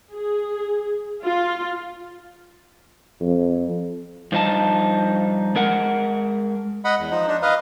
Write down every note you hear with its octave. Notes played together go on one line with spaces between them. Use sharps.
G#4
F4
F2
G2 F3 D#4 A5
G#3 A#4 F#5
D#5 F#5 B5
E2
F3 D#4
D4 D#4
B4 D#5 F5